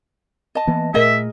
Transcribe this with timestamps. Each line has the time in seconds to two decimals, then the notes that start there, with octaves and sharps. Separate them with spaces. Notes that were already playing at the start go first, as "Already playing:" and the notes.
0.55 D#5 A5
0.67 E3 A#3 B3
0.94 A#2 A3 G#4 A#4 D#5 E5